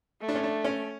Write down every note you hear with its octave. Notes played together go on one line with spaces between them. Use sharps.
A3
D4
C#4
D4
C#4